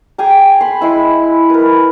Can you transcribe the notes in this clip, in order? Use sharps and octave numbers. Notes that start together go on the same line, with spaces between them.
G#4 G5 G#5 A#5
B5 C6
G#3 E4 E6
A#4 B4